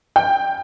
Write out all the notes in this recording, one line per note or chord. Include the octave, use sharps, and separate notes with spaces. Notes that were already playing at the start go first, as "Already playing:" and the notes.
G5